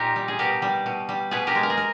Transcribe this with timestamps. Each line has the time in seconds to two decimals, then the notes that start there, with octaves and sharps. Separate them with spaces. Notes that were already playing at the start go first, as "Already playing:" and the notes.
Already playing: A#2 D#4 G4 A#4
0.16 G3
0.28 G#4
0.39 B2 G4 A#4
0.62 G3
0.86 B2
1.09 G3
1.31 B2 G#4 B4
1.47 G4 A#4
1.55 G#3
1.63 A#4
1.70 G#4
1.77 A#4